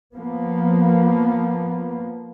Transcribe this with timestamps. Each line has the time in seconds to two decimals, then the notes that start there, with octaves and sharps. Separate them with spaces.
0.15 F3 A#3 B3